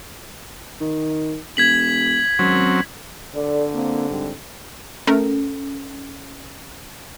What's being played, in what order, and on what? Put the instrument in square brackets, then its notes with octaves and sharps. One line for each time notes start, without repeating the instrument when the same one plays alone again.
[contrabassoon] D#3
[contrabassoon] E1 [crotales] G#6 B6 F#7
[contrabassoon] G#1 [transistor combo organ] F#3 C4 C#4
[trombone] D3 [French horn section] A4 D5
[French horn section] A#3 C4
G#2 G3 C4
[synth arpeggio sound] A3 A#4 [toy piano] C#4 A4